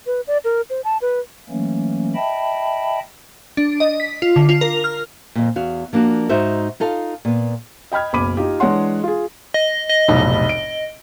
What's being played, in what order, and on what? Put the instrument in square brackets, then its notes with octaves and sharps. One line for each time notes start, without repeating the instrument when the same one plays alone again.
[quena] B4
D5
A#4
C5
A5
B4
[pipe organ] E3 F#3 A3 A#3 C#4
D#5 E5 G5 A5 B5
[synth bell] D4
D#5
B6
F4
D3
F4
A#4
F6
[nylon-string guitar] F2 A#2
E2 F#4 F5
F3 A#3 D4 F#4
G#2 D#4 F#4 C5 E5
D#4 F4 A4 F5
A#2 B3
[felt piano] D#5 G5 B5 F6 G#6
F#1 B1 B5 D6 D#7
D#4 F4 G4
E3 G#3 D4 C#5 F#5 C6
F4 G#4
[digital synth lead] D#5
D#5
[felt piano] F1 B1 A2
D7